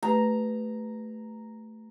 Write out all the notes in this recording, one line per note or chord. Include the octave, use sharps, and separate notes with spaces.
A3 G4 B4 A#5